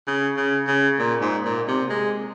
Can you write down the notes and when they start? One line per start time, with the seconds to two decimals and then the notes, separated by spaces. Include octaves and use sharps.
0.08 C#3
0.37 C#3
0.68 C#3
0.99 A#2
1.21 G#2
1.45 A#2
1.68 C3
1.90 G#3